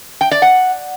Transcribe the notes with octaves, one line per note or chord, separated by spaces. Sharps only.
G5
D5
F#5